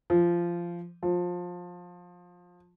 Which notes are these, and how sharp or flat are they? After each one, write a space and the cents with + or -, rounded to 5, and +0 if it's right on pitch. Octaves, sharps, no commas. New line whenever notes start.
F3 -15
F3 +20